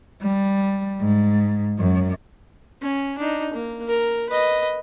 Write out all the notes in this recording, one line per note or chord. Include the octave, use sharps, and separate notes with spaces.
G3
G#2
F#2
C#4
D4 D#4
A#3
A#4
B4 D#5